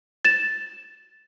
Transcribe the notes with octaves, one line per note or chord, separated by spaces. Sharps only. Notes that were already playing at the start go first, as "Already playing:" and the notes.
A6 E7